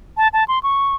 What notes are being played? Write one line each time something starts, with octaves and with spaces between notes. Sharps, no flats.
A5
A5
C6
C#6